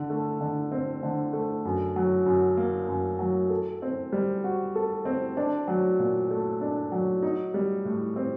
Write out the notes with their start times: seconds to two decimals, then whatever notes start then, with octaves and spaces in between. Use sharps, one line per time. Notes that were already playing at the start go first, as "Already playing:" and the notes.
Already playing: D3
0.10 A3
0.41 D3
0.72 C4
1.03 D3
1.33 A3
1.65 F#2
1.96 F#3
2.26 F#2
2.57 A#3
2.89 F#2
3.19 F#3
3.50 A4
3.82 C4
4.12 G3
4.44 F#4
4.75 A4
5.05 C4
5.37 D4
5.68 F#3
5.99 A#2
6.31 A3
6.61 D4
6.92 F#3
7.22 D#4
7.54 G3
7.85 A2
8.16 C4